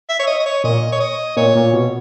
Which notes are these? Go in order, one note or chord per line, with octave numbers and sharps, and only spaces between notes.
E5
C#5
D#5
D#5
C#5
A#2 D#5
C#5
D#5
A#2 C#5
A#2
B2